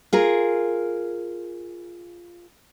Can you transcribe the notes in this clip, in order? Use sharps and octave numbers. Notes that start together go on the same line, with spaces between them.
F4 G#4 A#4